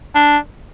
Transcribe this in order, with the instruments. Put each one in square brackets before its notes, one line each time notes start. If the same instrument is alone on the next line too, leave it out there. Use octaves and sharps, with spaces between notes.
[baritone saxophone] D4